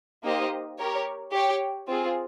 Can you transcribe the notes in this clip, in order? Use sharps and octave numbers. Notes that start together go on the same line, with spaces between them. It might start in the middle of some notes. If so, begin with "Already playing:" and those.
A#3 D#4 G4 C5 D#5
G4 A#4 C#5
G4 C#5 G5
C4 F4 G#4